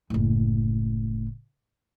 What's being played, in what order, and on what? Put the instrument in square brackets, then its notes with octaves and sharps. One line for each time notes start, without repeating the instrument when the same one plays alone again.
[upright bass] F#1 A2